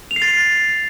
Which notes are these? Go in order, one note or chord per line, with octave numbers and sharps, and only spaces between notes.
F7
C7
A6